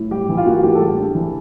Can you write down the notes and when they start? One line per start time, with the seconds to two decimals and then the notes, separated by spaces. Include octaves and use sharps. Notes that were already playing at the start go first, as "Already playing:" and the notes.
Already playing: A2
0.11 G3 G4
0.29 E3
0.37 F4
0.46 A#3 F#4
0.58 F#4
0.63 A2 G4
0.75 A4
0.80 G3 G#4
0.98 D4
1.15 E3